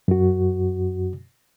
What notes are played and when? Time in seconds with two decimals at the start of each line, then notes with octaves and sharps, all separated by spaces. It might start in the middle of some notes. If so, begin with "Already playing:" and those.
0.08 F#2 F#4